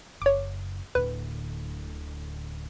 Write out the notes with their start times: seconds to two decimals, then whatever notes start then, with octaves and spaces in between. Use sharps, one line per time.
0.22 F#1 C#5 D6
0.95 D1 A2 D3 B4